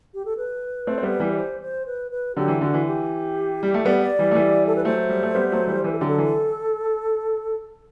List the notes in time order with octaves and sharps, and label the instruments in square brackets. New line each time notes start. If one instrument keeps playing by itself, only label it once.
[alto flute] G4
A4
B4
[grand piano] A3 C4
C4
G3 B3
E3 G3
[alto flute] D5
C5
C5
B4
B4
[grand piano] D3 F#3 [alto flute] G4
[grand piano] E3
[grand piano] D3 [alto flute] F#4
[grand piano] E3
[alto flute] G4
[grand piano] G3
A3
[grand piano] G3 B3 [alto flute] D5
[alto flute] D5
[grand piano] E3 G3
A3
E3 G3
[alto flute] A4
B4
[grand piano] F#3 A3 [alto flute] C5
[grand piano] G3
A3
G3 B3
F#3 A3
E3 G3
[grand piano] E3 [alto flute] B4
[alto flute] A4
[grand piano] D3 F#3 [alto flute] G4
[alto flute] A4
[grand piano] E3